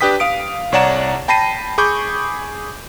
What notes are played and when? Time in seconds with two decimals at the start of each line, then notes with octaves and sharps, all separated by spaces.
0.01 D4 G4 B4 G5 D#6 B6
0.20 F5 D#6 D7
0.72 C2 C#5 D5 F#5 A#5 E7
1.28 G5 A5 B5 A#6 C7 D#7
1.78 G#4 B5 C#6 D6 G6